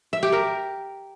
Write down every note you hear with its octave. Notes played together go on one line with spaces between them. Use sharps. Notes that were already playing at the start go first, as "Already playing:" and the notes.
E5
G4
A#4